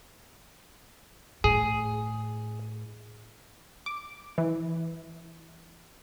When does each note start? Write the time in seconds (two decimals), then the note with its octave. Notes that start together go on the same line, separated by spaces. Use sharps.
1.44 A2 G#4
3.86 D6
4.38 E3